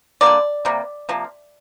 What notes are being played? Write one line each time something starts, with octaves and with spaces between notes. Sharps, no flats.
D3 G3 A#3 D5
C3 G3 A#3
C3 F3 A#3